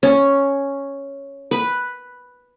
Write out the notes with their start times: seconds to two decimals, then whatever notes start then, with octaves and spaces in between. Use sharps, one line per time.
0.03 C#4
1.51 B4